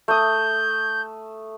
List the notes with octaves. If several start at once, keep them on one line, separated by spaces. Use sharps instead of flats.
A3 D#6 G6